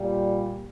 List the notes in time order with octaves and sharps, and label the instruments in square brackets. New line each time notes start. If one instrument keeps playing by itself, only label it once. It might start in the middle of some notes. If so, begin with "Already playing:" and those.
Already playing: [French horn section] A#2 G3